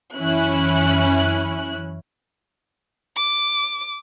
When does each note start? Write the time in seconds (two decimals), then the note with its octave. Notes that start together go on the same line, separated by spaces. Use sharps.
0.16 F#2 E3 C#4 E4 F#6
3.16 D6